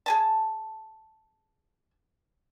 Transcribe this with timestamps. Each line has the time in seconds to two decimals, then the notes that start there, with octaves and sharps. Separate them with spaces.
0.06 G#4 G#5 A5